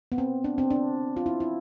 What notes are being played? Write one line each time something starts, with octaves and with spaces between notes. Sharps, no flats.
B3
C4
D4
C4
D4
F4
E4
E4